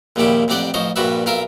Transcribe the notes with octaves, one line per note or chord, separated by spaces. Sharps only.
A#1 D#2 C#3 G3 E4 G4
A1 F2 C4 G4 D5 F#5
A1 F3 C5 C#5 D#5
A#1 G2 G3 F#4 B4 E5
B1 F4 A#4 E5 F5